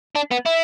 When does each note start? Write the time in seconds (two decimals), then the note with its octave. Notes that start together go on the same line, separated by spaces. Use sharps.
0.16 D4
0.31 B3
0.46 E4